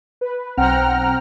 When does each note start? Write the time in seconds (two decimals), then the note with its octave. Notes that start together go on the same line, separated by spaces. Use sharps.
0.21 B4
0.57 B1 C4 F#5 G5 A#5 F6